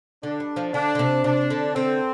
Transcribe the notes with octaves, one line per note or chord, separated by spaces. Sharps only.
D3 D4
G3
F3
D3 D4
D3
C3
C3 D4
D3
D3 C4